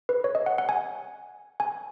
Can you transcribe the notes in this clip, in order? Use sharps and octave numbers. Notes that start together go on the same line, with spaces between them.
B4
C#5
D#5
F#5
F#5
G#5
G#5